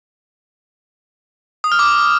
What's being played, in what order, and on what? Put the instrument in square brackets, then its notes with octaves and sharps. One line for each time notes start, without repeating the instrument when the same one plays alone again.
[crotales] D#6
F6
D6